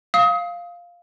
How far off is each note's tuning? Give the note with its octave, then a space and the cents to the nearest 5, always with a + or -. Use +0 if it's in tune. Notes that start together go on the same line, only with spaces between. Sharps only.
F5 +0 D#6 +35